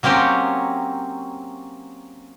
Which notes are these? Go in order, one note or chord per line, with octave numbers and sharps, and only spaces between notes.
F#3 A#3 C4 C#4 G4